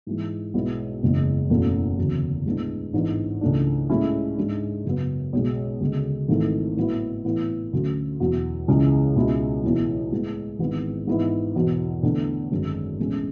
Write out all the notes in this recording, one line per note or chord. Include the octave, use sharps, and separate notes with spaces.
G#2 E3 G#3
B1 B2 G#3 B3 E4
F#1 E2 C#3 G#3
F#1 E2 B2 A3 C#4
E1 D2 C#3 F#3
A2 G#3 B3 D4
A1 G#2 E3 B3 D4
C#2 C#3 E3 A3 D4
A2 G#3 C#4 E4
G#2 G#3 D4
F#2 C#3 F#3 B3
B1 B2 G#3
D2 C#3 G#3
G#1 G#2 E3 A3
A2 F#3 B3 E4
A2 E3 B3
D2 D3 F#3 A3 C#4
E1 E2 B2 F#3
C#2 C#3 E3 G#3 C#4
C#2 B2 G#3 C#4 E4
B1 A2 E3 G#3
A2 G#3 B3
G#1 G#2 E3 G#3 B3
G#2 E3 B3 E4
E1 E2 B2
E2 D3 A3 D4
G#1 F#2 D3 G#3
B1 A2 E3 G#3 C#4